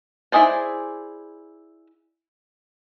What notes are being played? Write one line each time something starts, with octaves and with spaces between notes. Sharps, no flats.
E4 F#4 G#4 C5 D5